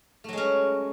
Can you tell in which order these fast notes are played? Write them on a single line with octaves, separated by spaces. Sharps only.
A3 F#3 G#3 C#4